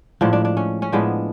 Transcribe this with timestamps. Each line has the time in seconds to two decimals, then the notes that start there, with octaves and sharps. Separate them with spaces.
0.21 A2 F3 G#3 D4
0.33 D4
0.45 D4
0.57 C#4
0.82 C#4
0.92 A2 F3 G#3 B3 D4